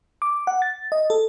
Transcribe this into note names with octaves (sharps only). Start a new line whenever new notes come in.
D6
F#5
A6
D#5
A4